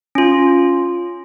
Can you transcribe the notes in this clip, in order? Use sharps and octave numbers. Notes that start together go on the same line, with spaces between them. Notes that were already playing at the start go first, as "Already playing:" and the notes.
C#4 F4